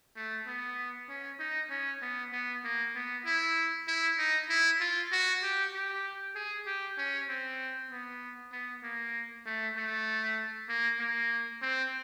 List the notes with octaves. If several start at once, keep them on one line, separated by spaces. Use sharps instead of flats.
A3
B3
C#4
D#4
C#4
B3
B3
A#3
B3
E4
E4
D#4
E4
F4
F#4
G4
G4
G#4
G4
C#4
C4
B3
B3
A#3
A3
A3
A#3
A#3
C4